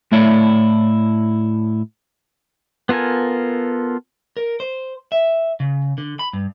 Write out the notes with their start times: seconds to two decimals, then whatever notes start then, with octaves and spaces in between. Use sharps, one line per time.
0.12 A2 A3 E4 C#5 D5
2.89 B3 F4 A4 A#4 G#5
4.37 A#4
4.60 C5
5.12 E5
5.60 C#3
5.98 D3
6.19 B5
6.33 G2